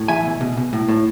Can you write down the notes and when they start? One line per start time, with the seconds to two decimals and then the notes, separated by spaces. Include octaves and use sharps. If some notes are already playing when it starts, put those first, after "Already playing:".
Already playing: A2
0.08 E3 E5 G#5
0.25 B2
0.41 B2
0.57 B2
0.73 A2
0.89 A2